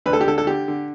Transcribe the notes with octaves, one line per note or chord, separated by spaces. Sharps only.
D2 B4
A4
G4
D3 A4
A4
D3 G4
D3